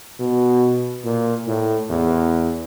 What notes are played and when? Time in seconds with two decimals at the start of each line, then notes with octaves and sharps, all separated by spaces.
0.19 B2
1.05 A#2
1.47 A2
1.90 E2